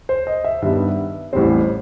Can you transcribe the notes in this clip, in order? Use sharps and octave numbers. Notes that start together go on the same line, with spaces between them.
C5
D#5
E5
G2 D#3 G3 B3 E5
A1 A2 G3 C4 C5